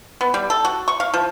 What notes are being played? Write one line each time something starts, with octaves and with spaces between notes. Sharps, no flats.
B3
G3
A4
F#4
C#6
F5
F3